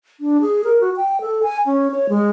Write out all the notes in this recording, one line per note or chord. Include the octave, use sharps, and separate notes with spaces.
D4
G#4
A#4
F#4
G5
A4
G#5
C#4
C#5
G#3